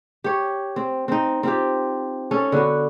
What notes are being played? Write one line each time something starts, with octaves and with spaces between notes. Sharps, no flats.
G4 C#5
C4
C4 D#4
C4 F4 G4
C#4 A4
D3 B3 F#4